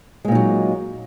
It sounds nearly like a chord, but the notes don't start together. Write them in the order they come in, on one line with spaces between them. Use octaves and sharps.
G#3 A#2 D#4 F#3